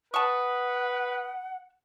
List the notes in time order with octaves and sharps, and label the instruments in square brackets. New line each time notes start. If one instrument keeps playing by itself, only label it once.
[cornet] B4 [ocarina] F#5 [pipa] A5 C#6 [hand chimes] D#6